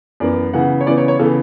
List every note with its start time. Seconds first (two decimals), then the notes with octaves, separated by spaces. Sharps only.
0.20 F#2 E3 B3 D5
0.53 C#3 E3 B3 F#5
0.81 C#5
0.86 C#3 E3 B3 D5
0.98 C#5
1.08 C#5
1.19 C#3 E3 B3 A4